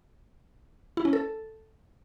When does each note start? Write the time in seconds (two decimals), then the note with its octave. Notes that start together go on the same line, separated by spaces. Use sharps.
0.97 E4
1.05 C#4
1.13 A4